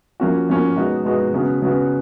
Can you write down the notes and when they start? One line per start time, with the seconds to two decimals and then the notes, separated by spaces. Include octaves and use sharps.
0.20 F3 A#3 C#4 F#4
0.49 F3 A#3 C#4 F#4
0.76 B2 G#3 B3 D#4 F#4
1.05 B2 G#3 B3 D#4 F#4
1.33 C#3 F#3 B3 F#4
1.62 C#3 F#3 B3 F#4